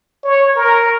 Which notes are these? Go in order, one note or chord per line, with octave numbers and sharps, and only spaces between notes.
C#5
A#4